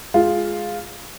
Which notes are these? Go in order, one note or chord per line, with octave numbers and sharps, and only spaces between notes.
G#3 F4